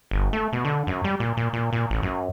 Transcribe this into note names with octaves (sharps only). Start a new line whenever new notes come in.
G1
A3
B2
D3
F#2
G3
A#2
A#2
A#2
A#2
A1
F#2